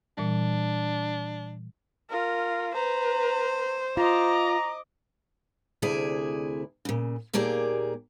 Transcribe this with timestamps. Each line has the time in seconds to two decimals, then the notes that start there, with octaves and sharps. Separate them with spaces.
0.18 A#2 E3 G3 D4
2.10 F4 A#4
2.75 B4 C5 A#5
3.97 F4 D#5 A#5 D6
5.82 D2 C3 E4 G#4 D5
6.85 A#2 C#3
7.33 D#2 A#2 A#3 G4 G#4 D5